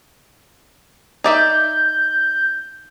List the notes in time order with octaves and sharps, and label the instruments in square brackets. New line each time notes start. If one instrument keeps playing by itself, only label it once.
[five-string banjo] D#4 D5 E5 [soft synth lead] G6